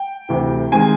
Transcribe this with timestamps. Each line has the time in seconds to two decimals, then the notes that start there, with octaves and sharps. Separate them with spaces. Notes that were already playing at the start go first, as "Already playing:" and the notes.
Already playing: G5
0.29 D2 C3 E3
0.72 D#3 G#3 C4 G#5